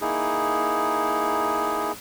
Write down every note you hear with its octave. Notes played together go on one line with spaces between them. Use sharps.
A#3 D#4 E4 G#4